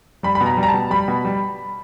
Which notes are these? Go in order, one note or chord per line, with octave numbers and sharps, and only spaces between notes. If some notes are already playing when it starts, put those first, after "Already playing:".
G3 B5
B5
B2
A#5
G3
A#5
A5
B2
G3 B5
B2
G3